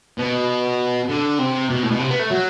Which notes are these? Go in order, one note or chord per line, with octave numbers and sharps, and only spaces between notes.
B2
D3
C3
B2
A2
B2
C3
B3
A3
F#3